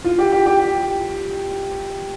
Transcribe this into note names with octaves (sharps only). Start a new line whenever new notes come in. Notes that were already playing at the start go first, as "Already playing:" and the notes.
F4
G4
G4
G4